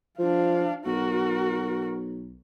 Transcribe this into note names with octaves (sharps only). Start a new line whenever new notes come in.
F3 D4 F5
B1 F#4 A#4